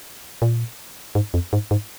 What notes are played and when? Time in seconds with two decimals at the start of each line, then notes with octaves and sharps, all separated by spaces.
0.42 A#2
1.15 G#2
1.34 F2
1.53 G#2
1.71 G#2